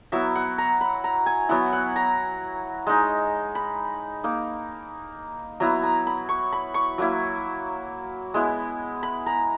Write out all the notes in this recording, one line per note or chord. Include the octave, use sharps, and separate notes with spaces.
F#3 B3 E4 E5
F#5
A#5
B5
A#5
G#5
F#3 B3 E4 F#5
F#5
A#5
G#3 D#4
B5
A#3 D#4
F#3 B3 E4 A#5
A#5
B5
C#6
B5
C#6
F#3 A#3 E4
G#3 B3 E4
B5
A#5